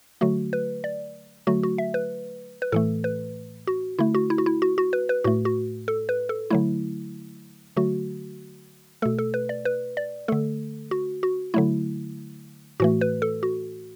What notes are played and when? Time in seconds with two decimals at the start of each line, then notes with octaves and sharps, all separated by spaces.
0.21 D3 F#3 A3 F#4
0.53 B4
0.84 D5
1.47 D3 F#3 A3 F#4
1.63 F#4
1.78 E5
1.94 B4
2.62 B4
2.72 A2 E3 A3 A4
3.04 B4
3.67 F#4
3.99 D3 A3 E4
4.15 F#4
4.30 E4
4.38 F#4
4.46 E4
4.62 F#4
4.78 F#4
4.93 B4
5.09 B4
5.24 A2 A3 F#4
5.45 F#4
5.88 A4
6.09 B4
6.29 A4
6.50 D3 F#3 A3 E4
7.77 D3 F#3 A3 F#4
9.02 B2 A3 A4
9.19 A4
9.34 B4
9.49 D5
9.65 B4
9.97 D5
10.28 D3 A3 A4
10.91 F#4
11.23 F#4
11.54 D3 F#3 A3 E4
12.80 A2 E3 A3 F#4
13.01 B4
13.22 A4
13.43 F#4